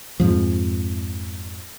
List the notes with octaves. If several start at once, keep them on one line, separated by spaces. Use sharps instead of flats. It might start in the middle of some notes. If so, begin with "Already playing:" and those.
F2 G#2 F3